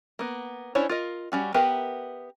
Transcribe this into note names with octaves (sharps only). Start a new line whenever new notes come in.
A#3 B3
C#4 D4 E4 C5 C#5
F4 A#4 D#5
G3 C#4 F#4
B3 G4 A#4 B4 E5